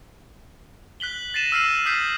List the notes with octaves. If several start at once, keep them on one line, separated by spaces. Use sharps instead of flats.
F#6 B6 F#7 G7
A6 A#6 C7 D#7 E7
E6 F6 A#6 C7 D#7 F#7
D#6 F6 G6 B6 C7 F#7